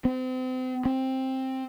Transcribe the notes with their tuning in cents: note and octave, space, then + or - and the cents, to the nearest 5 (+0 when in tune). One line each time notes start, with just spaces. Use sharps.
C4 -35
C4 +10